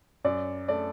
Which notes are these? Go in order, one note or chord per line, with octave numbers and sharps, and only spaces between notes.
F#2 D5
A3 D5